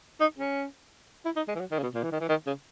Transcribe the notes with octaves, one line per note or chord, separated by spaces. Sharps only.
D#4
C#4
E4
D#4
G#3
E3
F#3
D#3
C#3
B2
A#2
E3
D#3
E3
D#3
C#3